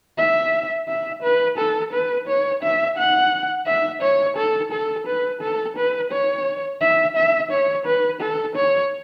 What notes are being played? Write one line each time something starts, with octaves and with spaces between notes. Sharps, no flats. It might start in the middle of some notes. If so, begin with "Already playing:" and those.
E5
E5
B4
A4
B4
C#5
E5
F#5
E5
C#5
A4
A4
B4
A4
B4
C#5
E5
E5
C#5
B4
A4
C#5